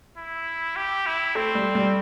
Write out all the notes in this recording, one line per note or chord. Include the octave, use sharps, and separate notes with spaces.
E4
G4
E4
A3 C4
G3
G3